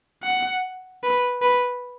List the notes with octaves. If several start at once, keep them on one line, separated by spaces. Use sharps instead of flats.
F#5
B4
B4